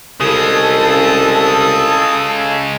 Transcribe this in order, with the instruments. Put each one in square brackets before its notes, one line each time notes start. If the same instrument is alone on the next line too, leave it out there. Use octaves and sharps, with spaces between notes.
[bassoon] C2 [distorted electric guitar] C#3 G#3 [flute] A4 [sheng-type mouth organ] D#6